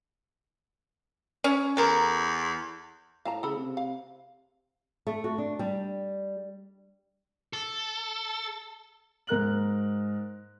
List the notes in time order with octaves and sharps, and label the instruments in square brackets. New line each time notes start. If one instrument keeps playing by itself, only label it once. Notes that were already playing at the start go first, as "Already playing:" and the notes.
[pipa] C#4
[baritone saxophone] E2 [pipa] A4 A#4
[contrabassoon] A2 [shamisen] F5 A5 A#5
[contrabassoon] C#3 [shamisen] A4 B5
[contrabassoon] C3
[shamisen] F5
[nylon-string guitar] A3
F#4
D4
G3
[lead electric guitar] A4
[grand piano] G#2 A#4 F#6 F#7